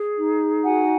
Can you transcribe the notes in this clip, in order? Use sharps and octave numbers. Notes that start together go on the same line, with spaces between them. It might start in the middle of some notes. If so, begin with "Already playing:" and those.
Already playing: G#4
D#4
F#4 F#5 G#5